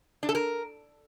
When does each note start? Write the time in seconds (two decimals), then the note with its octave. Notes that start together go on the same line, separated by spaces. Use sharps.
0.23 D4
0.29 A4
0.35 A#4